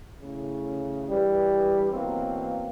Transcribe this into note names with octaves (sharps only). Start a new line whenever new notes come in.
A2 C#3
G2 E3 G3
B2 E3 F#3 A#3 C4